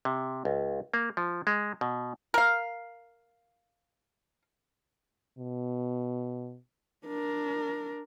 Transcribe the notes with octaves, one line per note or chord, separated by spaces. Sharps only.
C3
C#2
A#3
F3
G#3
B2
A#4 F5
B2
D4 A#4